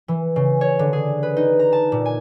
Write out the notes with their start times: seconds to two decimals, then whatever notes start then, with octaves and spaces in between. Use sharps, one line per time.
0.08 E3
0.36 C#3
0.61 C#5
0.79 D3
0.93 G#4
1.23 B4
1.37 D#4
1.59 A#5
1.73 A5
1.92 A#2
2.06 G#5